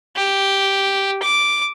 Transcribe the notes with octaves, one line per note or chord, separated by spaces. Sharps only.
G4
D6